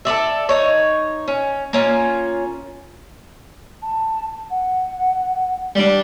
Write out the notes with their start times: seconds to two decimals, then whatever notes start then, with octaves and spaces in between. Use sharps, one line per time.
0.05 A4 B4 D5 E5
0.49 D#4 C#5
1.28 C#4
1.73 A#3 C#4 F4
3.82 A5
4.51 F#5
5.75 G3 D4